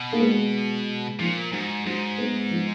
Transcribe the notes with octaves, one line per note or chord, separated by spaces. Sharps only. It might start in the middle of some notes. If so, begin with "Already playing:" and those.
Already playing: B2
A#3
G#3 B3
A#2 F3
G#2 F#3
G#2 F#3
G#3 B3
F3